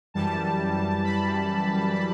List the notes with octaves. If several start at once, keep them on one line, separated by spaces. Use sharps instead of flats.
F#2 E3 G3 A5
B5
B5